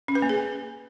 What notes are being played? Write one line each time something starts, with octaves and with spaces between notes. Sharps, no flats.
C#4
B4
A#3
G#4